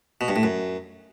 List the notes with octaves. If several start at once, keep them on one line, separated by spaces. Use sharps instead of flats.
B2
G2
A2
F#2